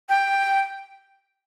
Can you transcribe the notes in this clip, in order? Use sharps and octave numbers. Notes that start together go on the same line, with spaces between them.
G5